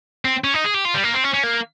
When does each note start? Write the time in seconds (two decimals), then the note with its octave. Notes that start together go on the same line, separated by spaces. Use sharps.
0.25 C4
0.44 C#4
0.54 D#4
0.64 G#4
0.74 G4
0.85 F4
0.94 G3
1.04 A#3
1.14 C4
1.24 C#4
1.34 C#4
1.43 A#3